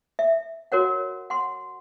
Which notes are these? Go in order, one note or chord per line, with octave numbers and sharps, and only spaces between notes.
E5
F#4 A#4 C#5 F#5
F#5 C6